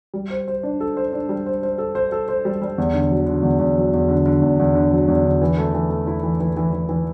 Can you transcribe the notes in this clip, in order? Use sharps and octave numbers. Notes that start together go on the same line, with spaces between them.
G3
C5
C5
D4
A4
C5
D4
G3
C5
C5
A4
C5
A4
C5
G3
G3
E2
D3
F#3
D3
E2
E2
F#3
E2
D3
D3
E2
E2
D3
F#3
E2
D3
E3
A3
E3
A3
E4
E3
E3
E3
E3
E3